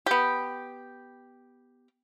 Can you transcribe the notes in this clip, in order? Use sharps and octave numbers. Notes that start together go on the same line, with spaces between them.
B3 G4